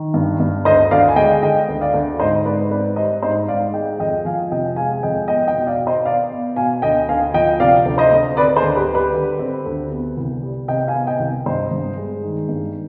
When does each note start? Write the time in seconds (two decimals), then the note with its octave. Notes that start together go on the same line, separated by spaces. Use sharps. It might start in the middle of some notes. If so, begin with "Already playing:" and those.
Already playing: D#3
0.14 G2
0.40 G2
0.65 D2 C5 D#5
0.91 D2 D5 F5
1.09 G#5
1.16 G#3 D#5 G5
1.42 D3 D#5 G5
1.68 D2
1.81 D5 F5
1.94 D2
2.19 G#2 C5 D#5
2.45 G#2 B4 D5
2.71 C4 B4 D5
2.96 G3 C5 D#5
3.23 G#2 C5 D#5
3.48 G#2 D5 F5
3.73 G#3 D#5 G5
3.99 F2 D#5 G5
4.25 F3 F5 G#5
4.52 C3 D#5 G5
4.76 G#3 F5 G#5
5.03 F2 D#5 G5
5.28 B3 D#5 G5
5.47 D#5 G5
5.54 B2
5.67 D5 F5
5.79 B2
5.87 C5 D#5
6.05 B3 D5 F5
6.31 B3
6.56 B2 F5 G#5
6.82 D2 D#5 G5
7.09 D2 F5 G#5
7.34 F3 D#5 G5
7.60 C3 D5 F5
7.85 D2
7.98 C5 D#5
8.12 D2
8.37 C4 B4 D5
8.56 G#4 C5
8.62 D2
8.75 G4 B4
8.89 G3
8.95 G4 B4
9.14 D3
9.39 C4
9.66 D2
9.91 B3
10.17 C2
10.43 G3
10.68 C3 D#5 G5
10.87 F5 G#5
10.94 B3
11.07 D#5 G5
11.20 C2
11.46 G2 C5 D#5
11.71 G2
11.97 G#3
12.23 D#3
12.49 G2